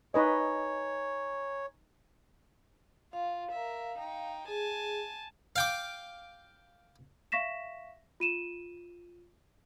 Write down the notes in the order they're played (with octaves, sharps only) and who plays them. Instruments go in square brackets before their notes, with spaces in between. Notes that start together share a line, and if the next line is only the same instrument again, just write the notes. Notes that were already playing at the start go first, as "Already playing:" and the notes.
[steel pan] D#4 B4 D#5 [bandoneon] C#5 [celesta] G#5 A#5 C#6
[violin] F4 [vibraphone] F5
[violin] A#4 E5
D#4 G5
[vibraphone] G#4 [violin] G#5 A5
[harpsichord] F5 G5 D6
[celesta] E5 F5 C#6 A#6 B6 E7
F4 D#7 E7